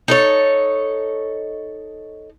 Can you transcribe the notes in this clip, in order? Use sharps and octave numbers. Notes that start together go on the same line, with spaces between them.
D#4 A4 C#5